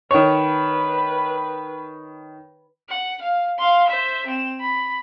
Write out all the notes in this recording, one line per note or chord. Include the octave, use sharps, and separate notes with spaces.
D#3 B4 C#5
F#5
F5
F5 C6
C5 E5
C4 E7
B5